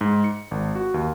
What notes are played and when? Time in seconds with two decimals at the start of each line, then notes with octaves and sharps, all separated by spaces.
0.01 G#2
0.24 C#7
0.51 G#1
0.75 F#4
0.94 D#2